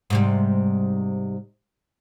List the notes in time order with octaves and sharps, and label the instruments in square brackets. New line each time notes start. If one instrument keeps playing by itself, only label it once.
[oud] G#2 C3 G3